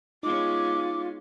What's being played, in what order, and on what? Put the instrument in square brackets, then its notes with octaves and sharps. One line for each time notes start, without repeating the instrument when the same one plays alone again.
[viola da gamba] G#3 B3 C#4 [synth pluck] D#4 [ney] F4 [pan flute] D6